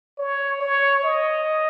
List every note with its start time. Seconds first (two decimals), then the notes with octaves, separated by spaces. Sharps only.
0.19 C#5
0.61 C#5
1.04 D#5